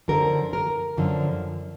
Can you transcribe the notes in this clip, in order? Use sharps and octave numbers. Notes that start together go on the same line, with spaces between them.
F#2 D3 F3 A#4
A#4
F#2 D3 F3